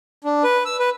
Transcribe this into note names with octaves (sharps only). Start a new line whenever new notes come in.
D4
B4
E6
B4